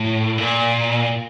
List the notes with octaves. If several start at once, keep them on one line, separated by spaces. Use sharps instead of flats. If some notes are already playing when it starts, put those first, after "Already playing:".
Already playing: A2
A#2